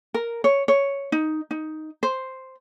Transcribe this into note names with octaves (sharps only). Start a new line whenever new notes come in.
A#4
C#5
C#5
D#4
D#4
C5